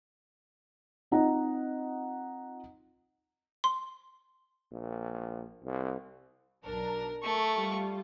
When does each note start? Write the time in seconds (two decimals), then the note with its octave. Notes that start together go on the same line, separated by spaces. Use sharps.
1.11 C4 D#4 F4 D#5 F#5 A#5
3.64 C6
4.72 A#1
5.64 C2
6.64 B1 D4 A#4 A#5
7.22 A3 A4 A#4 C#6
7.59 G3 F4